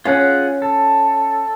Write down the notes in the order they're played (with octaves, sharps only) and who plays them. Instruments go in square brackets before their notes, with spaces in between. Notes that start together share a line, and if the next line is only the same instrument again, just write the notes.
[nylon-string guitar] C#4 [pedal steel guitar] F4 G#4 F#5
[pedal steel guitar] A4